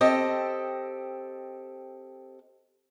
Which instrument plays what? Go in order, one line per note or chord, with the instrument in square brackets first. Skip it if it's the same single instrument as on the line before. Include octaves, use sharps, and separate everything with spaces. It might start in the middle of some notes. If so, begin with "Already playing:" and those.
[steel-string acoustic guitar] C4 G4 A4 D#5